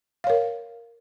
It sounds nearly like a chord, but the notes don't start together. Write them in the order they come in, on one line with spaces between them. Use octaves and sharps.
F5 C#5 A#4